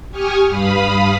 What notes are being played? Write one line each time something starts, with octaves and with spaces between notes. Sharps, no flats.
G4 G#5 C#6 D#6 F6
G2 F5 B5 D#6